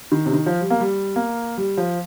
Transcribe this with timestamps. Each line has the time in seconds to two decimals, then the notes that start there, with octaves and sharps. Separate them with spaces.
0.12 D#3
0.26 C3
0.33 D#3
0.46 F3
0.61 G3
0.70 A#3
0.80 G3
1.16 A#3
1.58 G3
1.77 F3